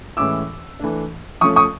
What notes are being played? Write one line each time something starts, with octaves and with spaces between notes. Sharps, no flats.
A2 E3 G#3 C#4 E4 D6 E6
E3 A3 D4
F3 A3 C#4 C#6 D#6
C#6 D#6